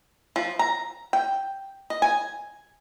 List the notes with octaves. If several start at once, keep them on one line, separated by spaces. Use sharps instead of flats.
F3
A#5
G5
D#5
G#5